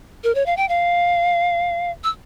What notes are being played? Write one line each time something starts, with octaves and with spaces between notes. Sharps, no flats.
A#4
C#5
F5
G5
F5
E6